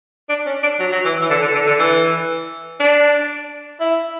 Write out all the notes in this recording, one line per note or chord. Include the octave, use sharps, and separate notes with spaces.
D4
C#4
D4
F#3
F#3
E3
E3
D3
D3
D3
D3
E3
D4
E4